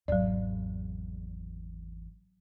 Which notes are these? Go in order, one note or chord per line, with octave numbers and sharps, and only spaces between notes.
G#1 E2 F#3 D5